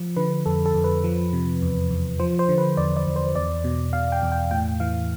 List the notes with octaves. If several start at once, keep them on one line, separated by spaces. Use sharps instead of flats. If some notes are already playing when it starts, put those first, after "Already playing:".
Already playing: F3
D3 B4
F2 A4
A4
F2
B4
F3
C3
E2
E2
F3 C5
C5
D3
B4
E2 D5
D5
E2
C5
E2 D5
B2
B2 F5
G5
E2
G5
A2 G5
E3 F5